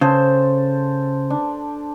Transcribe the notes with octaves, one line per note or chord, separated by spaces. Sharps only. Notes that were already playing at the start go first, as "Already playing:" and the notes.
C#3 A4 C5
D4